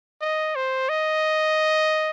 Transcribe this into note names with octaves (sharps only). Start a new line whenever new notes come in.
D#5
C5
D#5